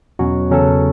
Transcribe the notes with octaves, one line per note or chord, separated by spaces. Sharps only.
E2 B2 F#3 C#4 F#4
E2 C#3 F#3 C#4 A4